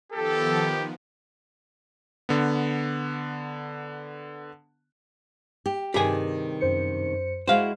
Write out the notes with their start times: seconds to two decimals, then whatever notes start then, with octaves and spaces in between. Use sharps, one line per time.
0.12 D#3 F3 B3 G4 A4
2.29 D3 B3
5.66 G4
5.94 G2 C3 D#3 G4 G#4 G#5
6.61 F#2 C5 C#7
7.48 G#3 E4 F#4 C5 F5